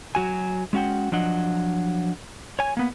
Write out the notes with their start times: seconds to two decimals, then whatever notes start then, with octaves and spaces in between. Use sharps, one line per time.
0.15 F#3 F#4 G#5
0.73 G#3 C#4 F#4 F#5 G5
1.12 F3 F#3 D4 D#5 F#5
2.59 C#5 G#5
2.77 A#3 B3